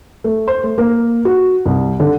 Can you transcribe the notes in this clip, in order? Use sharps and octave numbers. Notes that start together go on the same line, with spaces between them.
A3
C5
A3
A#3
F#4
C2
D3